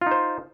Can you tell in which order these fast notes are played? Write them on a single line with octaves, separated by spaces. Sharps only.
F4 D#4 C5